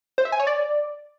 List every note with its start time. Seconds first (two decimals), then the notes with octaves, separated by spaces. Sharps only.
0.18 C5
0.25 E5
0.32 G#5
0.40 C#5
0.47 D5